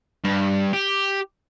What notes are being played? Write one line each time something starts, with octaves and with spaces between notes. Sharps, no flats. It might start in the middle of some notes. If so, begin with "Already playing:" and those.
G2
G4